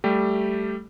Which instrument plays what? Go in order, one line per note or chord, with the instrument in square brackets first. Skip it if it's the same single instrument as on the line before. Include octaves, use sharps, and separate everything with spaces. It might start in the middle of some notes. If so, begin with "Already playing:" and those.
[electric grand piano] G3 A3 G4